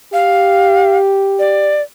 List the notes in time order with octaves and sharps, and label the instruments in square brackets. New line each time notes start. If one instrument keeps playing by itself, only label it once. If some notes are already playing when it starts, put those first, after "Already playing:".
[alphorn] G4 [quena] F5
[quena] D5